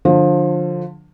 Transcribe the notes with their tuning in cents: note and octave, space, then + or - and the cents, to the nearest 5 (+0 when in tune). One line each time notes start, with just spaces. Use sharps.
D3 +15 F3 +25